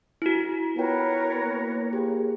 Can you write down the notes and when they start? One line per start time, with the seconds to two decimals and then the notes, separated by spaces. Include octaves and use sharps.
0.22 E4 F#4
0.76 B3 F4 A#4 B4 C#5 G5
1.40 A#3
1.93 G4 G#4 G5